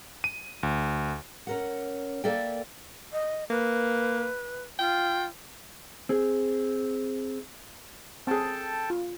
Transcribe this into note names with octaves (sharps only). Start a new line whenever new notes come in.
D#7
D2
C#4 A#4 F#5
A#3 A4 D5 E5 G5
D#5
A#3 B4
F4 G5
C4 G#4
C4 G#4 A4 G5 A5
F4